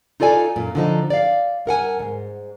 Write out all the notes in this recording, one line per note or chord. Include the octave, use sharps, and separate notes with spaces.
D#4 F4 A4 D5 G#5
F#2 A#2
D3 F3 D#4
D5 F5
G2 A#4 F#5 G#5
D#2 G#2